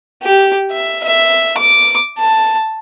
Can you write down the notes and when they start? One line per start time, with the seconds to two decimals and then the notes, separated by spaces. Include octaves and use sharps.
0.23 G4
0.72 E5
1.04 E5
1.58 D6
2.19 A5